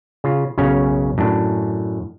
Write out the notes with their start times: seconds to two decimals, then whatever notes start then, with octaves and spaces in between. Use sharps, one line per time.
0.24 C#3 F4
0.58 B1 F#2 C#3 C#4 F5
1.18 F#2 A2 D4